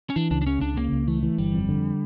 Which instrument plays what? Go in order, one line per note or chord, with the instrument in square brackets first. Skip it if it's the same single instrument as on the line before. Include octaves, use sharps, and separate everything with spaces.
[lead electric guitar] C#4
[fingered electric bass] E3 [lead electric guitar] D4
[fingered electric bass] C#2 [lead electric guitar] D4
[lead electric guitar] D4
[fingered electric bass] C#3 [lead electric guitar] C#4
[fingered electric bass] C#2 [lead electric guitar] D4
[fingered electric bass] C#3 [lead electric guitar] A#3
[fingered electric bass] C#2
[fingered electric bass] E3 [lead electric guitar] A3
[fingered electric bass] E3
[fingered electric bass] G1 [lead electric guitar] G3
[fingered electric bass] F2
D3